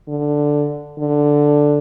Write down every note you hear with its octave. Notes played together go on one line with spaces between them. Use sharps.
D3
D3